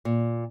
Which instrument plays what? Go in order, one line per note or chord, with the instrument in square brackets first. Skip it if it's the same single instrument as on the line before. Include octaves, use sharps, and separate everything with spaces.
[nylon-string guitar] A#2